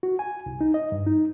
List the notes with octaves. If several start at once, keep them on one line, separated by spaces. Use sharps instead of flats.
F#4
G#5
C2
D#4
D#5
G2
D#4